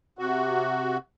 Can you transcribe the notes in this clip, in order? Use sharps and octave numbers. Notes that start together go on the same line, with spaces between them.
C3 F#4